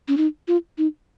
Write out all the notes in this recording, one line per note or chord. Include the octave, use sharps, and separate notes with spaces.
C#4
D#4
F4
D#4